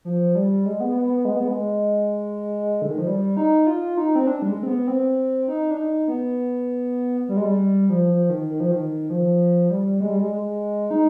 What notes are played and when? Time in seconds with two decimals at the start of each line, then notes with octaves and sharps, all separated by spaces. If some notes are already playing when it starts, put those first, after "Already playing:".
0.05 F3
0.35 G3
0.65 G#3
0.80 B3
0.95 B3
1.10 B3
1.25 G#3
1.37 B3
1.48 G#3
2.82 D3
2.90 D#3
2.98 F3
3.07 G3
3.37 D#4
3.67 F4
3.97 D#4
4.15 C4
4.27 D4
4.42 G3
4.48 G#3
4.63 C4
4.67 B3
4.87 C4
5.48 D#4
5.71 D4
5.77 D#4
6.08 B3
7.29 G3
7.37 G#3
7.45 G3
7.89 F3
8.09 F3
8.30 D#3
8.50 D#3
8.60 F3
8.72 D#3
9.10 F3
9.70 G3
10.00 G#3
10.10 G3
10.20 G#3
10.31 G#3
10.91 D#4